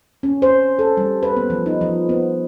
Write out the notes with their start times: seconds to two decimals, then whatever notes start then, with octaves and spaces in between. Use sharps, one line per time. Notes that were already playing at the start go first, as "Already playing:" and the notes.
0.23 C#4
0.42 C5
0.79 A4
0.97 G3
1.23 B4
1.37 B3
1.50 F3
1.66 D#4
1.81 F3
2.09 B3